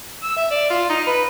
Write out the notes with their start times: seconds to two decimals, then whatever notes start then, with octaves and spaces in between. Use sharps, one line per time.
0.23 E6
0.37 E5
0.51 D5
0.70 F4
0.90 D#4
1.07 B4